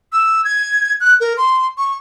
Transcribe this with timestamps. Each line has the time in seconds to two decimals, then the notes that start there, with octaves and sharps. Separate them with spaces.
0.12 E6
0.45 G#6
1.00 F#6
1.20 A#4
1.37 C6
1.77 C#6